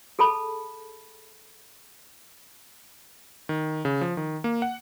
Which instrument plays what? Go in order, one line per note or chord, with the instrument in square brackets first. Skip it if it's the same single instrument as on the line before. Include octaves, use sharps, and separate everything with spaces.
[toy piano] G#4 A4 A5 B5
[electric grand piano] D#3
C#3
F3
D#3
A#3
F#5